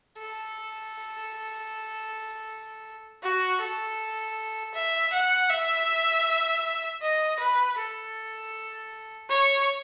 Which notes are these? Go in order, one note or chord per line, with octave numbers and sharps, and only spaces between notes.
A4
F#4
A4
E5
F#5
E5
D#5
B4
A4
C#5